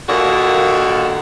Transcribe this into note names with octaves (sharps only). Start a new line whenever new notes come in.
D#2 A#2 D3 A#3 F#4